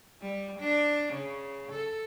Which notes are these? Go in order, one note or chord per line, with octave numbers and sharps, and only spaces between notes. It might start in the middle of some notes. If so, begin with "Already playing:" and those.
G3
D4
C#3
A4